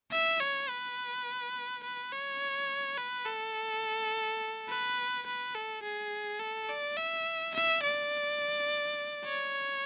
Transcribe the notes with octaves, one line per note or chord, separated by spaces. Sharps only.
E5
C#5
B4
B4
C#5
B4
A4
B4
B4
A4
G#4
A4
D5
E5
E5
D5
C#5